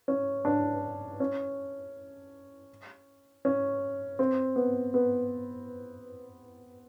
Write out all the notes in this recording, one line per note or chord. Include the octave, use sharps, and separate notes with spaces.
C#4
D4
C#4
C#4
C4
B3
B3